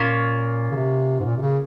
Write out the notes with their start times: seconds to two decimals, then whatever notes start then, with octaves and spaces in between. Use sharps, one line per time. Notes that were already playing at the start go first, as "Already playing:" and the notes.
Already playing: A#2 A#3 C#4 F4
0.71 C#3
0.76 C3
1.20 G#2
1.25 A#2
1.37 C3
1.41 C#3